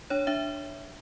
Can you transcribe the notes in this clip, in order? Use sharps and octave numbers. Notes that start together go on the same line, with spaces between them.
D4 C#5
D4 E5